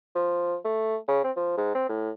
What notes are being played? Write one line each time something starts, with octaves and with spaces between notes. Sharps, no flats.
F3
A3
C#3
C4
F3
G#2
C4
A2